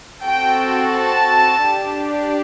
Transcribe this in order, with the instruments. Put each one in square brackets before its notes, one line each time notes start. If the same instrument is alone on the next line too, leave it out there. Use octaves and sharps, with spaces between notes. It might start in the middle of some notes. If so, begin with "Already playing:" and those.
[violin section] C4 F#4 A4 G5
A5
D4 G4